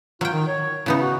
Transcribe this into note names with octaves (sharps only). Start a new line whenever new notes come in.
F#3 F4 G5
D#3
C#5
C#3 B3 D#4 E4
F#4